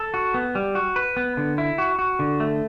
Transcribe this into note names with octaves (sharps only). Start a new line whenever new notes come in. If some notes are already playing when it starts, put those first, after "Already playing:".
Already playing: A4
F#4
B3
G3
F#4
B4
B3
D3
E4
F#4
F#4
D3
A3